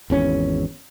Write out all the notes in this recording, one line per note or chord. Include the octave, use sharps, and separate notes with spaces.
G#1 E2 C#4